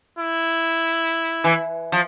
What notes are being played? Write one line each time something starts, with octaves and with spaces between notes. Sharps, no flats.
E4
E3
F3